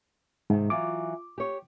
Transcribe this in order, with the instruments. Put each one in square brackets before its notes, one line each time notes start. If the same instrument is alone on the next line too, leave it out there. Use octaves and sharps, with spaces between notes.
[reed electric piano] G#2 [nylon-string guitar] C3 D#3
[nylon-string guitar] E3 F#3 F4 [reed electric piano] D6
[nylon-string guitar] G4 C#5